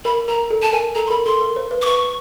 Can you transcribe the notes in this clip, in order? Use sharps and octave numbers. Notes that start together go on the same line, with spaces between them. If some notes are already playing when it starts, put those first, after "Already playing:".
A#4 B5
A#4 A#5
A4
A5
A#4 G#5
A4 A#5
C6
A#4 B5
A4 C6
A#4
C5
B4
D6
B4 C#6